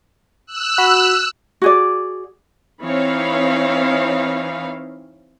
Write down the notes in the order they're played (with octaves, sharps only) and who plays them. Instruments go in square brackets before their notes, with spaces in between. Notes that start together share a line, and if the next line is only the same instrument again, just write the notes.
[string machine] E6 F#6
[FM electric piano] F#4 B5
[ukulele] F#4 G#4 D5
[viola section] E3 C4 D#4 C#5 F5 B5